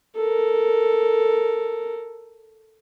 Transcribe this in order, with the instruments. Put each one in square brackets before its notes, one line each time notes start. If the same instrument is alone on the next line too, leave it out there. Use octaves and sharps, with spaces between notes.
[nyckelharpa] A4 A#4